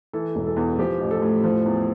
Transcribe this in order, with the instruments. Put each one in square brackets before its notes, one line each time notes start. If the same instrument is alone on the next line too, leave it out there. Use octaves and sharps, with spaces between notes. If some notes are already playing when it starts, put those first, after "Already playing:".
[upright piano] E3 A4
E1
A4
E2
F3 G4
A1
A4
A2
F3
E2